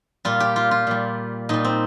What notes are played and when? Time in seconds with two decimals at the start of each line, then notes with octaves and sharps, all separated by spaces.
0.25 A#2 G3 F4
0.40 G4
0.56 F4
0.71 F4
0.87 A#2 G3
1.49 A#2 G3 D#4
1.64 C4